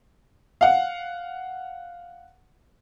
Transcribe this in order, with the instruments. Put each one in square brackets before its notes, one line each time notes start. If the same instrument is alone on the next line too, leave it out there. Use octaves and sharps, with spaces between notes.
[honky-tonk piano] F5 F#5